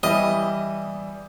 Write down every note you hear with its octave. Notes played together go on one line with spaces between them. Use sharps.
E3 G3 D#5 E5